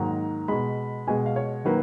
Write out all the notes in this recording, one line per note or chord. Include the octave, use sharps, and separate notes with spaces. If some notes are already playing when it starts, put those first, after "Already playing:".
Already playing: G#2 D#3 F#3 A#3 A#5
B2 G#3 B5
B2 G#3 G#5
F5
C#5
D#3 F#3 A#3 B4